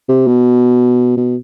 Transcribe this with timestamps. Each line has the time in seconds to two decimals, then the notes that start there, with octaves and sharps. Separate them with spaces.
0.09 C3
0.27 B2
1.17 B2